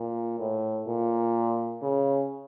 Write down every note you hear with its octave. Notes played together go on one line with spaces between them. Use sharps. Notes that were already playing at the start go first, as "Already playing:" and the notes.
Already playing: A#2
A2
A#2
C#3